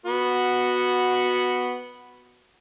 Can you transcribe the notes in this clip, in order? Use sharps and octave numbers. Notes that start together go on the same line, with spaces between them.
B3 F#4